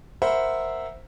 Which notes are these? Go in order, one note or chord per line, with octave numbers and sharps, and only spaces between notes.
A#4 C5 E5 F#5 B5